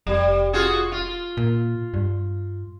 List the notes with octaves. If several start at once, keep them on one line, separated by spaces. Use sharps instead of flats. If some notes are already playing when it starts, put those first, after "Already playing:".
F1 G3
F4 F#4 G#4
F4
A#2
G2